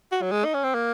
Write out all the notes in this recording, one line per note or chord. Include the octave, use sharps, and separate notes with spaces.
F#4
F#3
G#3
D#4
C#4
C4
A#3